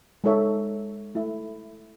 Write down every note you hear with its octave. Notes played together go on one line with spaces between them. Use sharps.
G#3 D#4 A4 C#5 E5
A3 E4 A4 E5